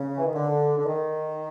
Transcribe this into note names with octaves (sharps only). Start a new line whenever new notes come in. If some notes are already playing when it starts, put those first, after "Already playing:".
Already playing: C#3
E3
D#3
D3
D3
D#3